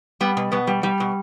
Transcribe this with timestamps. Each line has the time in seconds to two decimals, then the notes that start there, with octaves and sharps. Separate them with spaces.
0.21 G3 B3
0.37 B2
0.52 B2 B3
0.67 G3
0.83 G3
1.00 B2